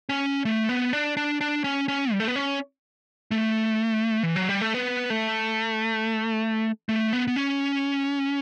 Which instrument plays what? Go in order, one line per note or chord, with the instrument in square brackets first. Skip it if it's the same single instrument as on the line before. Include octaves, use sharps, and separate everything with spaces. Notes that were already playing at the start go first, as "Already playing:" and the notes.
[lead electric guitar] C#4
A3
B3
D4
D4
D4
C#4
C#4
G3
A3
B3
C#4
A3
E3
F#3
G3
A3
B3
A3
A3
B3
B3
C#4